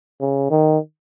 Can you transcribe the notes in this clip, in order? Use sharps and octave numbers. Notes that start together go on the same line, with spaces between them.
C#3
D#3